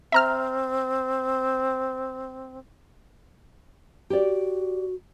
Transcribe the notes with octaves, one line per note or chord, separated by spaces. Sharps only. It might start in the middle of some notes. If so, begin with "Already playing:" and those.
C4 E5 A#5 F6
F#4 G4 D5